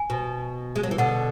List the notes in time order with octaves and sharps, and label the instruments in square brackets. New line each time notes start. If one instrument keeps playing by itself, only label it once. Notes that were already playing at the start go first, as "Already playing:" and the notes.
Already playing: [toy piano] G#5
[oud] B2
G#3
F#3
E3
[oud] B2 D3 [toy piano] F#5